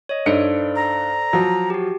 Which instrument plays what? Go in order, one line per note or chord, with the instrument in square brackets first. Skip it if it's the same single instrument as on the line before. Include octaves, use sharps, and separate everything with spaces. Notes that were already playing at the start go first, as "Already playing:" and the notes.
[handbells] C#5 D#5
[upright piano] G2 D#4 C#7 [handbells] A4 C5 D5
[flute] A#5
[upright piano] F3 F#3
[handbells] F#4 G4